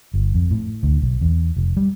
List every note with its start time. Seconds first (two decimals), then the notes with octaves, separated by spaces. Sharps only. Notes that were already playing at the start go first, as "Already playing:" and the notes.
0.14 G1
0.34 F2
0.51 A2
0.83 D2
1.02 B1
1.21 E2
1.56 F1
1.77 G3